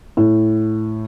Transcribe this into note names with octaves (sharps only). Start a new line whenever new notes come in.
A2